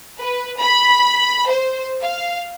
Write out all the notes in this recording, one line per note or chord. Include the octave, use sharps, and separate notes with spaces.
B4
B5
C5
F5